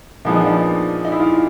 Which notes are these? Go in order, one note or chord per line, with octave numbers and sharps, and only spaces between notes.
A#2 F3 G#3 B3 D#4
D4
D#4
D#4
E4
F4